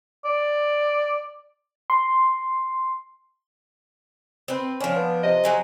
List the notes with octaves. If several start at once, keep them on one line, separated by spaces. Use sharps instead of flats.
D5
C6
C4 B4
F3 C#4 D4
B3
C3 D#5
F#3 C4 G#4